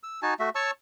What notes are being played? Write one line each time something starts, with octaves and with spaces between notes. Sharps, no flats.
E6
D#4 F#4 G#5 A5
A3 F#4 E5
C#5 A5 C#6 E6